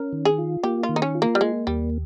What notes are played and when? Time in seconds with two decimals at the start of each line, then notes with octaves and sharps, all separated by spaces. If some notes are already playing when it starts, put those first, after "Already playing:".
Already playing: C#4 A#4
0.13 D#3
0.25 G#4
0.38 F4
0.63 A#3 G4
0.83 F4
0.89 D#3
0.96 D#4
1.02 C#4
1.15 F4
1.22 A#3
1.35 G3
1.41 G#3 A#3
1.67 D#2 G3